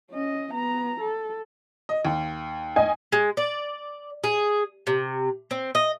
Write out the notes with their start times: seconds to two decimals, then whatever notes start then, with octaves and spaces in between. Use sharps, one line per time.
0.11 C#4 D#5
0.53 B3 A#5
1.00 A4
1.89 D#5
2.05 D#2
2.76 D#5 G#5
3.12 G#3
3.37 D5
4.24 G#4
4.87 C3
5.51 C4
5.75 D#5